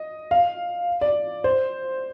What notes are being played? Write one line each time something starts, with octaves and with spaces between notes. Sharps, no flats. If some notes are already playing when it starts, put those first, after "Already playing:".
Already playing: D#5
F5
D5
C5